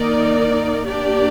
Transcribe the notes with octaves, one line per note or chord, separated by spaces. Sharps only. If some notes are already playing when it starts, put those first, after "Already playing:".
Already playing: D#3 A#3 D#4 A#4 D5
A#3 D4 G4 D5